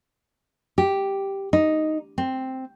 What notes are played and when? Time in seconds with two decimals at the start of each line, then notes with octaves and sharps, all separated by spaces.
0.78 G4
1.53 D#4
2.18 C4